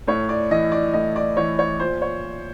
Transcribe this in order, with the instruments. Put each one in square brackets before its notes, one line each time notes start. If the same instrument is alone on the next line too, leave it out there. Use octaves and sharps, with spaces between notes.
[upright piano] A2 C#5
D5
E3 D#5
D5
A2 D#5
D5
E3 C#5
C#5
A#2 C5
C#5